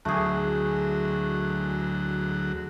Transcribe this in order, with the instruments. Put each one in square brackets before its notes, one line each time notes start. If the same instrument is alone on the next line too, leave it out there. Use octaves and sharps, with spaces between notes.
[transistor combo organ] D2 F#3 [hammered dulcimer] A3 G#4